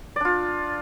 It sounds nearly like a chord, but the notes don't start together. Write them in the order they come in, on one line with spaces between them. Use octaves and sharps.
D5 D4 F4